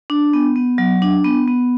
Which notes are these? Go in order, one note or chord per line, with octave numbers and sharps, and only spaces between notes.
D4
B3
B3
F#3
D4
B3
B3